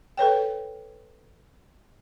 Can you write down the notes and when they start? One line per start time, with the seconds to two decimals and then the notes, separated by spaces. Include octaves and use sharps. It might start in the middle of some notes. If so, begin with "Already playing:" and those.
0.17 A4 B4 C#5 G5